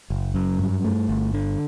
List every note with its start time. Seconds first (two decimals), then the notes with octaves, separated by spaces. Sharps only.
0.10 F#1
0.34 F#2
0.59 G2
0.84 A3
1.09 G1
1.34 D3